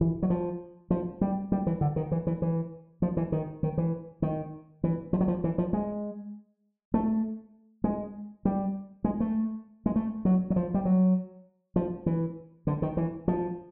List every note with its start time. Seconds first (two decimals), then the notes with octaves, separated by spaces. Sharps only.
0.01 E3
0.23 F#3
0.30 F3
0.90 F3
1.21 G3
1.52 G3
1.67 E3
1.81 D3
1.96 D#3
2.12 E3
2.27 E3
2.42 E3
3.02 F3
3.17 E3
3.32 D#3
3.63 D#3
3.78 E3
4.22 D#3
4.84 E3
5.13 F3
5.21 F#3
5.28 F3
5.44 E3
5.58 F3
5.73 G#3
6.94 A3
7.84 G#3
8.45 G3
9.04 G#3
9.20 A3
9.86 G#3
9.96 A3
10.25 F#3
10.50 F#3
10.56 F3
10.74 G3
10.85 F#3
11.76 F3
12.06 E3
12.67 D3
12.82 D#3
12.97 E3
13.28 F3